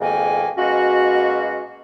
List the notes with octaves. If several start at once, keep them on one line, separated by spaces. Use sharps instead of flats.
F2 G#2 B2 D#3 A#3 G#5
B2 G#3 A#3 C#4 F#4